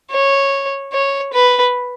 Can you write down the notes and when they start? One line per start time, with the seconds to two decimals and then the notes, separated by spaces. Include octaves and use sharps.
0.12 C#5
0.93 C#5
1.33 B4